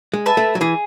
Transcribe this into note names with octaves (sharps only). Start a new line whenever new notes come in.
G#3
B4 E5 A5
A3
F#3
E3 G#4